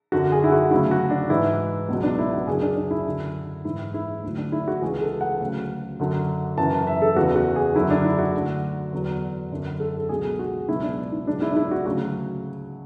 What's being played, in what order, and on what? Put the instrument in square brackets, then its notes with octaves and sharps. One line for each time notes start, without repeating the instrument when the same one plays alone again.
[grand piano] F#2 D3 F#3 F#4
G#4
E4
F#4
D2 C#3 F#3 E4
F#4
D4
G#2 E3 E4
C#2 B2 F#3
D4
E4
F#4
F#2 C#3 F#3 G#4
D4
D4
E4
F#2 D3 F#3
G#2 E3 E4
E4
D2 D3 F#3
D4
E4
F#4
C#2 C#3 E3 G#4
A4
F#5
D2 C#3 F#3
F#2 D3 F#3
F#2 C#3 E3 A5
E5
A4
E2 C#3 E3 F#4
F#4
G#4
F#2 D3 F#3 E4
D4
E4
F#4
D2 D3 F#3
E2 D3 F#3
F#2 D3 F#3
A4
A4
C#2 B2 F#3 G#4
F#4
C#2 B2 F#3 E4
D4
E4
C#2 B2 F#3 D4
E4
D4
E4
F#4
D2 C#3 F#3 F#4